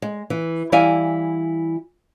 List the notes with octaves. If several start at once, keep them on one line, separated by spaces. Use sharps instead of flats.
G#3
E3
E3 G3 E4 F5 G#5